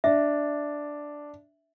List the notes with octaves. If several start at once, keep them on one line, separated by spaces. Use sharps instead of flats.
D4 E5